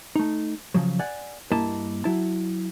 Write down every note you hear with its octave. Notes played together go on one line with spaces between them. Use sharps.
A3 D#4
C#3 F3 F#3
D5 F#5 G#5
G2 A#3 E4 D#5 A5
F#3 E4 A5